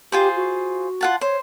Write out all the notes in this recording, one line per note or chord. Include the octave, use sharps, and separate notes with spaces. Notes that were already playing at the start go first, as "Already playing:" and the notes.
F4 G4 G#4 C5
F#4
F4 F#5 A5
C5 C#5